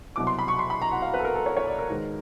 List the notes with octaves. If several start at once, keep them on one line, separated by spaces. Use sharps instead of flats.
C2 B2 F#3 D6
C6
B5
C#6
C6
B5
A#5
F#5
F5
B4
A4
A#4
A4
C#5
C#5
D5
A#4
G#2 D#3 G#3 A#4